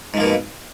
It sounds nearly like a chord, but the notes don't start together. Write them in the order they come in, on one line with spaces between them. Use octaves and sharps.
G#2 F3 A#3 B2